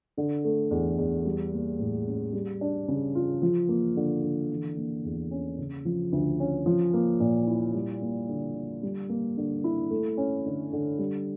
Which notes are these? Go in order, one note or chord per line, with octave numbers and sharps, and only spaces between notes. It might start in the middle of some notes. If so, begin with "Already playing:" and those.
D3
A3
E2
E2
G3
A#3
A2
C#4
G3
D4
C#3
F4
F3
A#3
D3
D3
E3
A#3
E2
C#4
C#3
F3
D2
C#4
F3
A#3
A#2
E4
G3
A#3
D3
D3
G3
A#3
D3
E4
A3
C#4
D3
D3
G3